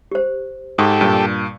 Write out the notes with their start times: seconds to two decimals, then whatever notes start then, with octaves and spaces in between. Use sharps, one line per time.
0.12 G4 C5
0.78 G#2 G4 A4 C#6 D#6
1.01 G2 A#2